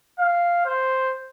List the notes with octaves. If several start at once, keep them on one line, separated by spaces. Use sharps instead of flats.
F5
C5